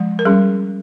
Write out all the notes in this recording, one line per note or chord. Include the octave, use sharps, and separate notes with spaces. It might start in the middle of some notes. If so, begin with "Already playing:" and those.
Already playing: F3 G#3
A#4
G3 C#4 G#4